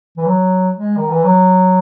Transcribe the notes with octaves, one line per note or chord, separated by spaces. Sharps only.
E3
F#3
G#3
D#3
E3
F#3